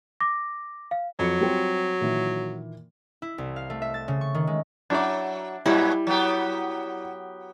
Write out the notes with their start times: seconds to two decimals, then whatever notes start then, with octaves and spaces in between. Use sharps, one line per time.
0.20 D6 A#6
0.91 F5
1.19 F2 F#3 C#7
1.41 G3 C4 F4
2.01 A#2 D#3 E3
3.22 E4
3.38 C2
3.56 F5
3.70 A3
3.82 E5
3.94 A6
4.08 C#3
4.21 C#6
4.34 D#3
4.47 G#3
4.90 F#3 D4 E4 D5
5.66 F#2 A#2 F#3 G3 E4
6.07 F#3 B3 G4